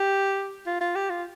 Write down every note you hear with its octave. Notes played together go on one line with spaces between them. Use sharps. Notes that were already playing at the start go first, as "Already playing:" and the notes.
Already playing: G4
F4
F4
G4
F4